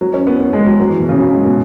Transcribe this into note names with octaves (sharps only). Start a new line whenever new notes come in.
F#3
C#4
B3
B3
G#3
F#3
F#3
E3
B2
C#3
F#3
G#3
B2